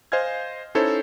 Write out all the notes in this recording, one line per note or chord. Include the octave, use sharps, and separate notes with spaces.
C5 D#5 F5 G#5 F6 G#6
C#4 D#4 E4 A4 C5 C#5